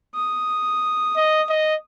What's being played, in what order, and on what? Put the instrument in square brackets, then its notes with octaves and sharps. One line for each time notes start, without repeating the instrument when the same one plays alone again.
[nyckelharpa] D#6
[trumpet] D#5
D#5